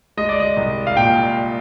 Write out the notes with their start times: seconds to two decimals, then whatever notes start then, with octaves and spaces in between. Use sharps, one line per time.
0.17 G#3 D#5
0.29 D5
0.40 D#5
0.57 C2
0.87 F5
0.97 A#2 G5